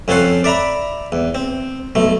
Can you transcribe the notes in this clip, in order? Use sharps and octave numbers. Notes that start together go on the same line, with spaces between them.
F2 C4 C#4 A4 F#5 C6
D5 E5 A#5 B5
E2
C4
B1 A3